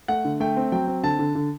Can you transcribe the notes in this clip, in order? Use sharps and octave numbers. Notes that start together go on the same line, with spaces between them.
A3 F#5
D3
A3 G5
C4
F#3 G5
C4
D3 A5
D3
D3